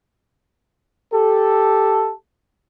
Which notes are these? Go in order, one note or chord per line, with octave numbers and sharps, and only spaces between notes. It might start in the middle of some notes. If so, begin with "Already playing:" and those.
G4 A4